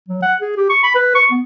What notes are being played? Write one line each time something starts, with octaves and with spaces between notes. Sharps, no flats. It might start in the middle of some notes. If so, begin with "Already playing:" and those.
F#3
F#5
G#4
G4
C#6
B5
B4
C#6
B3